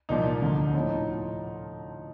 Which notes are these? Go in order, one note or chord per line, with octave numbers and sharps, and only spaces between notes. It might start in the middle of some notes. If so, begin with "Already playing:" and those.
C2 A#2 F3 D#4
D2 D3 F3
A2 F3 D#4
D#4